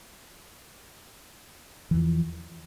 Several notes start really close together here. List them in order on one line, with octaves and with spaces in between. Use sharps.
E3 E2 F3